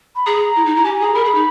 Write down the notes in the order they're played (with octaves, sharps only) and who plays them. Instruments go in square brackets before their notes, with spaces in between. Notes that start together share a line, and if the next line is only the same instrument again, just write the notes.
[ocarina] B5
[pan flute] G#4 [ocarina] A#5
[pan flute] E4
D#4
E4
[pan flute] G4 [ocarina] G#5
[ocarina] G#5
[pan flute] G#4 [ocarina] A#5
[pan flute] A#4 [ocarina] B5
[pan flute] G#4
D#4